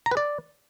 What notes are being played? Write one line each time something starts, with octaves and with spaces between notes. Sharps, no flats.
A#5
B4
D5